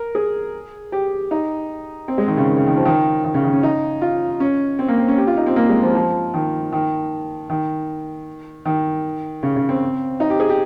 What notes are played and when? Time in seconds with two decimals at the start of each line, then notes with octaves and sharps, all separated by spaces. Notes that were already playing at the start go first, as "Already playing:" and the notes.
Already playing: A#4
0.15 G#4
0.92 G4
1.31 D#4
2.08 C4
2.18 G#3
2.28 D#3
2.37 C#3
2.47 D#3
2.57 C#3
2.67 D#3
2.76 F3
2.85 D#3
3.24 D#3
3.34 C#3
3.44 D#3
3.53 C#4
3.63 D#4
4.02 F4
4.40 C#4
4.79 C4
4.88 A#3
4.98 C4
5.08 C#4
5.17 G4
5.27 F4
5.37 D#4
5.46 C4
5.56 A#3
5.69 G#3
5.83 F3
5.95 F3
6.34 D#3
6.72 D#3
7.50 D#3
8.65 D#3
9.43 C#3
9.56 C#3
9.69 C4
10.20 D#4
10.30 G4
10.40 G#4
10.50 G4